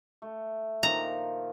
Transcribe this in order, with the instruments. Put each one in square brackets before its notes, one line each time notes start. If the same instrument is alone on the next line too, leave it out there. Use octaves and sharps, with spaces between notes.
[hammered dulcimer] A3
[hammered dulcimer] A#2 D#3 F3 [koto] A#5